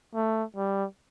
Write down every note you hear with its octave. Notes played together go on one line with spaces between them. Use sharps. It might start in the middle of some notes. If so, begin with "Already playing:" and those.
A3
G3